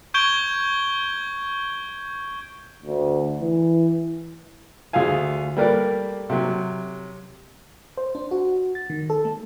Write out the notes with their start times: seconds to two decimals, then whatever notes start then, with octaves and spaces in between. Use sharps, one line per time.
0.14 C#6 G6 G#6 D7 G7
2.82 D2
3.41 E3
4.93 D2 F4 G#4 F5 G#5
5.57 G3 A3 A#3 A#4 B4 D5
6.30 C3 F#3
7.97 C5
8.15 D4
8.31 F#4
8.75 A6
8.90 D#3
9.10 A4
9.25 A3